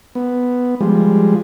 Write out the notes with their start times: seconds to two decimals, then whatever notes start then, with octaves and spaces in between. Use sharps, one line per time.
0.15 B3
0.81 F3 G3 G#3